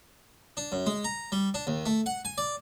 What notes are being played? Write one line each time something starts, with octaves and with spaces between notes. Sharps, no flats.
D4
F#2
G#3
A#5
G3
D4
D#2
A3
F#5
G#5
D5